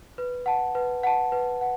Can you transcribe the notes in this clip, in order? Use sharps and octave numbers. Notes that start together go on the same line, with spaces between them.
B4
F#5 A5
B4
F#5 A5
B4
F#5